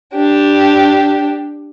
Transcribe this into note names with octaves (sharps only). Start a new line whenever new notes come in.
D4 G4